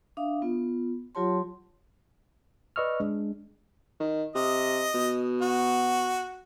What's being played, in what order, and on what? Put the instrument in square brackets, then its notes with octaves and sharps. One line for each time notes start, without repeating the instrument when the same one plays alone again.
[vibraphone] D4 E5 F5 D#6
B3 F4
F#3 F4 G4 C#5 A5 C6
[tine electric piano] B4 D5 D#5 C#6 E6 F6
G#3 D4
[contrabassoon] D#3
[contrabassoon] C3 [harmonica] D#5
[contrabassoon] B2
[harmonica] F#4